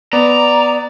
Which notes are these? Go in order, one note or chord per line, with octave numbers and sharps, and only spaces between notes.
B3 D5 A#5